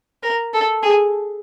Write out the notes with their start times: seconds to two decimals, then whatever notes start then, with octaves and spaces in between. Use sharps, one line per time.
0.23 A#4
0.54 A4
0.83 G#4